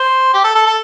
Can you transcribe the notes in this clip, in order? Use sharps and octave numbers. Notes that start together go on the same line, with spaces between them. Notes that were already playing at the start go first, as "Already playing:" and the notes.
Already playing: C5
G4
A4
A4
A4